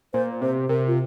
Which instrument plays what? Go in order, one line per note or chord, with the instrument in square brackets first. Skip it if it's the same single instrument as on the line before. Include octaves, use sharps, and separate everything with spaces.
[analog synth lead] A#2 [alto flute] C5
[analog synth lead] C3 [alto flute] C5
[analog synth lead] C3 [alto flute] A#4
[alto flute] F4